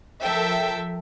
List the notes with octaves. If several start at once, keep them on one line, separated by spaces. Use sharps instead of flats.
F3 A4 A#4 E5 G5